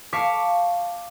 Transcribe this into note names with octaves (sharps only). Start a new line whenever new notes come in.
F5 A5 C#6 D6 B6 D7